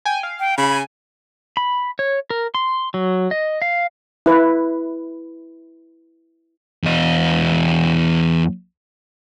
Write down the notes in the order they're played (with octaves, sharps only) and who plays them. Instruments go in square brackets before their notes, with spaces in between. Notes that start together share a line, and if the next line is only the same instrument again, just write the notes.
[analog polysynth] G5 G#5
F5
[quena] G5
[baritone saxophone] C#3 [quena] B5
[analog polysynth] G#5
[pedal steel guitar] B5
C#5
A#4
C6
F#3
D#5
F5
[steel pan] E4 B4
[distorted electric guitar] E2 D#5